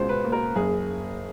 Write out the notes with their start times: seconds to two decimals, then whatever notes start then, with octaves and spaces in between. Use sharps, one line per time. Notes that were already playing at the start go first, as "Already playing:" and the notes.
Already playing: C#2 B2 C5
0.09 B4
0.24 A#3
0.32 A#4
0.55 F#1 G#4